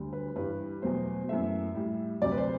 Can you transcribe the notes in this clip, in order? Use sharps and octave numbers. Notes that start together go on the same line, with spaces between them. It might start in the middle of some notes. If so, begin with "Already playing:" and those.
Already playing: D2 D3 G3
B4
G2 E3 G3 B4
E2 B2 F#3 A3 C5
F#2 E3 A3 E5
A2 G3
D2 C3 F#3 D5
B4
C5